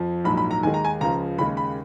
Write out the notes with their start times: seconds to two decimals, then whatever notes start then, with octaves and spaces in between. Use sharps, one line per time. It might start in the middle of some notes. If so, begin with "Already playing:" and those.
Already playing: F2 F3
0.24 A#1 G#2 F#3 B5
0.37 B5
0.51 A#5
0.63 D#2 D#3 G#3 G#5
0.74 A#5
0.85 G#5
1.01 C#2 C#3 F3 A#5
1.38 D#2 C#3 G#3 B5
1.57 B5